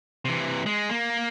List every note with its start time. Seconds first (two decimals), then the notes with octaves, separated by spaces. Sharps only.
0.25 C3 E3
0.66 G#3
0.90 A#3